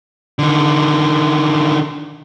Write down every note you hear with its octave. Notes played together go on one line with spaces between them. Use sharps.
D3 D#3